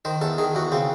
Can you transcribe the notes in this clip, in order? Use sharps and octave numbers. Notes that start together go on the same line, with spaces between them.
D#3 C5
E2 A4
D#3 G#4
E2 F#4
C#3 C4